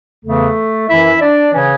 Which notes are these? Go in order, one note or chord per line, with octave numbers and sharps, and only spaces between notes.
E2 C#3 E3 A3 A4
F#2 E3 E4 E5
D4 D5
C#3 E3 C#4 C#5